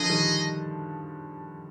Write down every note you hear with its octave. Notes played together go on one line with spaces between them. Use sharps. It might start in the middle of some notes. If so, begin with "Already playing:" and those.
Already playing: D3 F3 D#4 G#4 D#5
D#3 G3